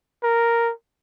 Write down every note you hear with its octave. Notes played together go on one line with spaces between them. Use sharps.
A#4